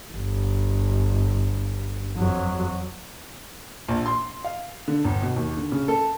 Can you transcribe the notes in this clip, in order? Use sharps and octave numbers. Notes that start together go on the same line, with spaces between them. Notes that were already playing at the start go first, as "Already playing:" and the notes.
G1
F2 F#3
A#1
C6
F5
D3
G1
B2
D#2
D3
C#3
A4